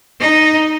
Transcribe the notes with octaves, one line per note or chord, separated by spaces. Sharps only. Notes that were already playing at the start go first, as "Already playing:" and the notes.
D#4